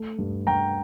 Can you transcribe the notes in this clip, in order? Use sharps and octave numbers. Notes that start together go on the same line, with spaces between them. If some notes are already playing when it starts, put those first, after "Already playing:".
Already playing: A3
G2
G2 G5 A#5